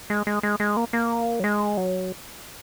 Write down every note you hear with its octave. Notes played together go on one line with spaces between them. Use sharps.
G#3
G#3
G#3
G#3
A#3
A#3
F#3
G#3
F#3